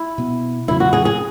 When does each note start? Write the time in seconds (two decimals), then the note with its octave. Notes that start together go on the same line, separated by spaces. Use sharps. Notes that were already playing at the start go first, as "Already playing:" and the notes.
Already playing: E4
0.18 B2 B3
0.68 E2 C#3 F#3 E4
0.80 F#4
0.93 G#4
1.05 G#4